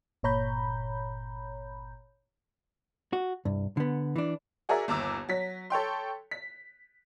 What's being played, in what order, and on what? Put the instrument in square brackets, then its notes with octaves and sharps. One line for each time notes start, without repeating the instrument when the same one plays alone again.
[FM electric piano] G1 A#2 C#5 A#5 B5 G6
[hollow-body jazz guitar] F#4
C2 G2
D3 B3
E3 D4
[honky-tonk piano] F#4 G#4 A#4 D5 E5
G1 D#2 A#5 D6 E6
F#3 B6
A4 C#5 G5 C6
B6